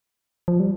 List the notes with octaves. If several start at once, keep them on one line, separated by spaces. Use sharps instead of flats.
F3
G3